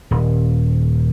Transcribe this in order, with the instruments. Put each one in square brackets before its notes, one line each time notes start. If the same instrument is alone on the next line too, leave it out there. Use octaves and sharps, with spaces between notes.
[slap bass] D#1